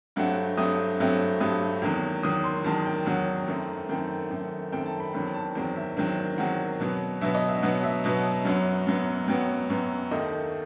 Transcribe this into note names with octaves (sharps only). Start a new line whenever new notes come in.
G2 F#3 A3 C4 F#5
G2 F#3 A3 C4 D#6
G2 F#3 A3 C4
G2 F#3 A3 C4 D#6
E2 D#3 F#3
E2 D#3 F#3 D#6
C6
E2 D#3 F#3 A5
G5
E2 D#3 F#3 F#5
F#2 D#3 A3 C4
F#2 D#3 A3 C4 G5
F#2 D#3 A3 C4
F#2 D#3 A3 C4 G5
A5
B5
E2 D#3 F#3 C4 B5
A5
E2 D#3 F#3 C4 G5
E5
E2 D#3 F#3 C4
E2 D#3 F#3 C4 F#5
B2 F#3 B3
B2 F#3 B3 E5
D#5
E5
B2 F#3 B3 F#5
E5
B2 F#3 B3
F#2 F#3 B3
F#2 F#3 B3
F#2 F#3 B3 G5
F#2 F#3 B3
D#2 D#3 A3 D#5